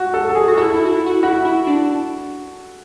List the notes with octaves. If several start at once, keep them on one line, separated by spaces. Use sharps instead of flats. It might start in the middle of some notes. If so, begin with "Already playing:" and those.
Already playing: F#4
A4
A4
G#4
F#4
E4 A4
E4
F#4
E4
F#4
E4 F#4
E4
D4